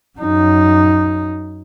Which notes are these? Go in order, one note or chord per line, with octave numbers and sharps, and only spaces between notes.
F#2 D#4